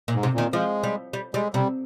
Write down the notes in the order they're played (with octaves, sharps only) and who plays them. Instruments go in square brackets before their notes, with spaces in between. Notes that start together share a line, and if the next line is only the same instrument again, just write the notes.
[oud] A#2
[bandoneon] G#2
[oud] C3
[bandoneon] A#2 [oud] D#3
[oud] F3 [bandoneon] G#3
[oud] G3
G3
[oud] G3 [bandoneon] G#3
[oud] C3 [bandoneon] G3